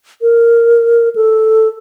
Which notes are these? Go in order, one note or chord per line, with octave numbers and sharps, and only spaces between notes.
A#4
A4